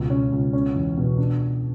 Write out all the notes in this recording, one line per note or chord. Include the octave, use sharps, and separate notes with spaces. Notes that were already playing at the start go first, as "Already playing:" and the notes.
Already playing: C#2 B2
C#4
C#2
C#4
E2
B2
D4